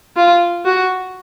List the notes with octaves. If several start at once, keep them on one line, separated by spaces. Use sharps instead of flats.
F4
F#4